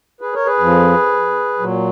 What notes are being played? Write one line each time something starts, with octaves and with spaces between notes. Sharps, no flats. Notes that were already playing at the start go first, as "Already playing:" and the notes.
G#4 B4
A#4 C#5
G#4 B4
F2 F3
A#2 F#3